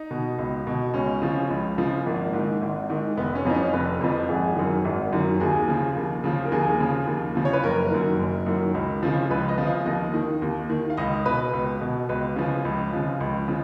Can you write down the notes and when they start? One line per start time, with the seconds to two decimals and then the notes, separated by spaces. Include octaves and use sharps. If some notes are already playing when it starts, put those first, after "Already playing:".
Already playing: D#4
0.11 B2
0.38 C#2
0.67 B2
0.94 C#2 C#4
1.22 C#3 F3
1.50 C#2
1.78 C#3 F3
2.06 G#1 A#3
2.33 G#2 D#3
2.62 G#1
2.89 G#2 D#3
3.17 F1 B3
3.35 C#4
3.45 F2 F3 D#4
3.54 C#4
3.73 F1 B4
4.01 F2 F3
4.29 G#1 G#4
4.56 F#2 D#3
4.85 G#1
5.13 F#2 D#3
5.40 D#2 G#4
5.68 C#3 F3
5.96 D#2
6.24 C#3 F3
6.45 A#4
6.52 D#2 G#4
6.80 C#3 F3
7.07 D#2
7.35 C#3 F3
7.45 C#5
7.53 B4
7.64 F#1 A#4
7.91 F#2 D#3
8.19 F#1
8.46 F#2 D#3
8.75 C#2
9.03 C#3 F3
9.30 C#2 B4
9.49 D#5
9.58 C#3 F3
9.67 F5
9.86 D#2 D#5
10.14 D#3
10.42 D#2
10.70 D#3
10.90 F5
10.97 C#2 D#5
11.25 B2 B4
11.54 C#2
11.81 B2
12.09 C#2 B4
12.36 C#3 F3
12.65 C#2
12.93 C#3 F3
13.20 C#2
13.48 C#3 F3